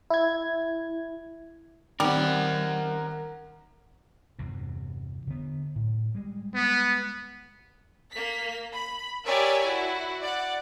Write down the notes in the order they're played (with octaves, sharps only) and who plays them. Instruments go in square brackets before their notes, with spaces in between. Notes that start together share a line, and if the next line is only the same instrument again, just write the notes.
[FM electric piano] E4 G#6
[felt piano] D#3 C4 D#4 [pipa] G3 [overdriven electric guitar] A#4 F#5
[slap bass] E2 G2 C3
D3 B3
A2
G3 G#3
[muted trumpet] B3
[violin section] A#3 B6
B5
G4 A#4 C#5 D5 E5 G#5
E4 F#4
D5 F#5